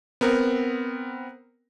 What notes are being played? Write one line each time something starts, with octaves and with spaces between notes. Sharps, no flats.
B3 C4 A#4